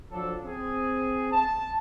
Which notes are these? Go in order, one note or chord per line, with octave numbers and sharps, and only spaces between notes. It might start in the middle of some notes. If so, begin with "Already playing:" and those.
F3 F#3 D4 A4
C4 G#4
A5